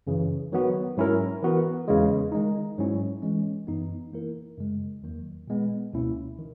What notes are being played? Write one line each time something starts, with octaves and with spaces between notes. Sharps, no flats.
F#2 C#3 E3
D#3 F#3 B3 F#4
G#2 F#3 C#4 E4 A#4
E3 B3 F#4 A#4
E2 C#3 E3 G#3
D#3 G#3 D#4
G#2 F#3 C#4 E4
E3 G#3 C#4
F#2 E3 B3 D#4
E3 A#3 E4 A#4
F#2 C#3 G#3
E2 D#3 F#3 A#3
A#2 G#3 B3
C#2 B2 A#3 C#4 E4
D#3